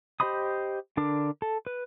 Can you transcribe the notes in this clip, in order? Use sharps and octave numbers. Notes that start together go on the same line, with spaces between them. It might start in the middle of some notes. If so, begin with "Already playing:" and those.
G4 C5 D#5 B5 D#6
D3 D4 A#4 D6
A4
B4